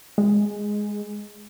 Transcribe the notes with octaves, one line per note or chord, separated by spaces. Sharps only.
G#3